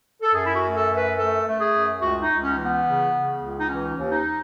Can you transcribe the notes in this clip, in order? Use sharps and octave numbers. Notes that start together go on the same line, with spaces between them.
A4
F#2 G#4
E4
F#4
A3
A4
F#2
B4
A3 A4
A3
G#4
F#2
C#2 F#4
D#4
C#2
C#4
E3
B3
C#3
C#3
C#2
D#4
E3 C#4
D#2
D#4